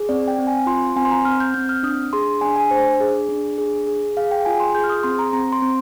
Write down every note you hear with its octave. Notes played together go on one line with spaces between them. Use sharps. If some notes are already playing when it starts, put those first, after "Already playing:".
Already playing: G#4
C4 D5
G5
C4
G#5
F4 C6
C4 G#5
C6
A#5
C4 F6
G6
C4 G6
F6
D4 D#6
G#4 C6
D4 G#5
G#5
D4 C5
G#4
D4
G#4
G#4
G#4 F5
G5
F4 G#5
C6
G#4 G6
F6
D#6
C4 C6
A#5
C4 A#5
C6
C4